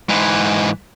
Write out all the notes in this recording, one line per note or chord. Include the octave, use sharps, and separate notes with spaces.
G#2 E3